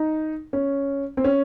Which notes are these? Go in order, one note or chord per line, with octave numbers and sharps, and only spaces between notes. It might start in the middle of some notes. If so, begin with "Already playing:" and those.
Already playing: D#4
C#4
C4
C#4